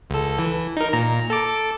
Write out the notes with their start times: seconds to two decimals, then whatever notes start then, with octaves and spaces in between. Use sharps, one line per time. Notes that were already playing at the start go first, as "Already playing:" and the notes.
0.10 C#2 A4
0.39 E3
0.77 D#4 A#4
0.93 A#2 A#5
1.30 A4 A5 D6